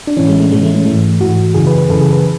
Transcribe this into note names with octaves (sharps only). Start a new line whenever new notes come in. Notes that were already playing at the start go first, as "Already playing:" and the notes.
D4
A2 E3 C#4
G#3
A3
A2 E3 G#3
A3
C#4
G#2 E3 A3
G#2 E3 F#4
F#2 C#3 E3 G#4
B4
B4
F#2 C#3 E3 A4
G#4
B4